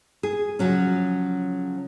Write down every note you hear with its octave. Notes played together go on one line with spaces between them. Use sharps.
G#4
C#3 F3 F#3 C#4